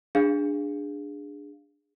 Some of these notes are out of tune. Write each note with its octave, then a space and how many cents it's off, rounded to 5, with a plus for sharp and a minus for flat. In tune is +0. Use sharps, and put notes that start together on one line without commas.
D4 +0 G#4 -15 F5 +0